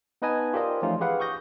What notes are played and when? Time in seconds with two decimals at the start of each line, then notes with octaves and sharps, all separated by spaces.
0.22 B3 D#4 B4 D#5 G#5 A5
0.53 F4 G4 A#4 C5 D5 D#5
0.82 E3 F3 A3 C#4 D#4 F4
1.01 G4 G#4 B4 F5 F#5
1.20 C#6 D#6 G6 A#6